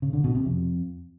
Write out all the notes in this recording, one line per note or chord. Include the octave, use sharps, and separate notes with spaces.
C#3
D3
B2
C3
F2